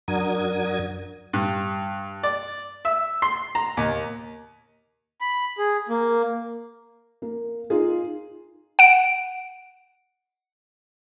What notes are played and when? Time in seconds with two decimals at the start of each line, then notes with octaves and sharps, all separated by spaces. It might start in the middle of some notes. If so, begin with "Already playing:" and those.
0.08 F#2 D4 F#4 A#4 D#6 G#6
1.33 G2
2.23 D5
2.85 E5
3.22 C6
3.55 A#5
3.77 D#2
5.21 B5
5.58 G#4
5.89 A#3
7.22 A#3
7.70 D#4 F4 G#4
8.79 F#5 D7